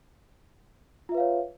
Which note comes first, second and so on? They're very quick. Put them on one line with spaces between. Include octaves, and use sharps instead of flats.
F4 E5 B4 F5 C#5